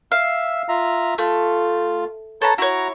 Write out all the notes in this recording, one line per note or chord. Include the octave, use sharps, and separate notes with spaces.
E5 F5 E6
F4 E5 A#5
A3 F4
A4 B4 C#5 A5 A#5
E4 F#4 C#5 A#5